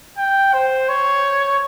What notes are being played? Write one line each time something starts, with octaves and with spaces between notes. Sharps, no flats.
G5
C5
C#5